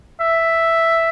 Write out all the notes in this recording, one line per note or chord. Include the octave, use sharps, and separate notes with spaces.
E5